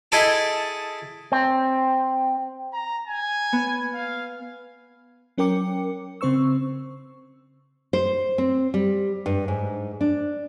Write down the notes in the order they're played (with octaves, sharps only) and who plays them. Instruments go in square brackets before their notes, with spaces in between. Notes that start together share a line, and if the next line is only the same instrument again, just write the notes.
[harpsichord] E4 G#4 A4 D#5 G5 A5
[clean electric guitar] C4
[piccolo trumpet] A#5
G#5
[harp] B3
[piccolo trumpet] F5
[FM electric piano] F#3 C#4 A#4 G5 D6 C#7
C#3 C4 C5 C#6 E6
[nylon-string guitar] C5
C4
G3
G2
G#2
D4